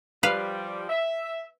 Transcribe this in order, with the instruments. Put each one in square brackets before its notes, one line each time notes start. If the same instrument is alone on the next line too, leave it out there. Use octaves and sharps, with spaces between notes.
[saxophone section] F3 G3 [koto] B4 F5
[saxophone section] E5